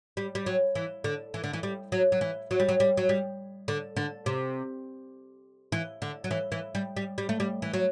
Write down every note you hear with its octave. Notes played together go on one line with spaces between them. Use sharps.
G3
G3
F#3
E3
D3
E3
D3
E3
G3
F#3
F#3
E3
F#3
G3
F#3
G3
F#3
G3
D3
D3
C3
E3
D3
F#3
E3
E3
G3
G3
G3
A3
G3
E3
F#3